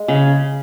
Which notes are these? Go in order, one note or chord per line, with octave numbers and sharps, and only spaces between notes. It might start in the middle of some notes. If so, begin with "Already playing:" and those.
Already playing: G#3
C#3